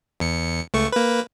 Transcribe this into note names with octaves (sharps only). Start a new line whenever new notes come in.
E2 C#7
C#2 A3 C#6
A#3 B4